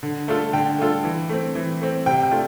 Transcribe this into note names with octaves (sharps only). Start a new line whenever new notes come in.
D3
A3 D4 F4 A4
D3 G5
A3 D4 F4 A4
E3
A3 C4
E3
A3 C4
C3 G5
G5
A3 D4 F4